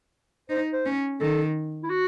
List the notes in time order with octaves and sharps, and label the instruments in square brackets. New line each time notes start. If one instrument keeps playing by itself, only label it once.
[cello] D#4 [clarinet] C5
[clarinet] C5
[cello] C#4
[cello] D#3 [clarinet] A4
[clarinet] E4
F#4